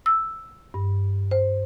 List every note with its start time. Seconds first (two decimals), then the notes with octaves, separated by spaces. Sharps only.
0.06 E6
0.74 G2
1.31 C5